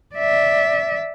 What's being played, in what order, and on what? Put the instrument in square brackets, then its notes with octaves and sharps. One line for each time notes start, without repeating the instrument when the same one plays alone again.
[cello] D5 E5